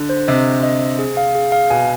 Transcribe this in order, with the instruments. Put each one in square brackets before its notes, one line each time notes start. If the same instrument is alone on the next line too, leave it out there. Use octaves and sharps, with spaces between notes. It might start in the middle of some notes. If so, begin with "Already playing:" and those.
Already playing: [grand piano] D3
[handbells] C5
[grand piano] C3 [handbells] D#5
[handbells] C5
D#5
C5
G#4
F5
G#4
F5
[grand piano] B2 [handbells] G#5